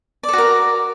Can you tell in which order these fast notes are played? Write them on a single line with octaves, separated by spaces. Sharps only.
D5 A4 F#4 A#4